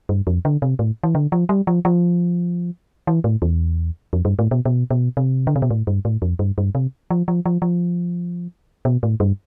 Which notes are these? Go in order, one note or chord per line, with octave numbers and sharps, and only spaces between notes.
G2
F2
D3
C3
A2
E3
D3
F3
G3
F3
F3
E3
A2
E2
F2
G2
A2
B2
B2
B2
C3
D3
C3
B2
A2
G2
A2
F2
G2
G2
C3
F3
F3
F3
F3
B2
A2
G2